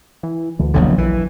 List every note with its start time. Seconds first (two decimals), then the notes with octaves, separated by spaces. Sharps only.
0.23 E3
0.59 D2 D3 E3 A3
0.74 E1 A#1 D3 F#3
0.98 A#1 E3